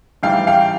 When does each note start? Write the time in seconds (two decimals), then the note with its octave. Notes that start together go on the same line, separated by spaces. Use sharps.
0.23 A1 G#2 E3 G3 F5 G5
0.47 F5 G5